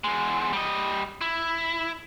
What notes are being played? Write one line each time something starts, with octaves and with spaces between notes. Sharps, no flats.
E2 G#3
G3 D#5
E4